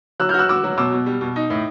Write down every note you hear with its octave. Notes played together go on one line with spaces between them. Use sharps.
F#3 E6 F#6
F6 G6
F#4
E6 F#6
F#4 D6 E6
F#3
B2 D6 E6
B2
G3
B2
D#4
A2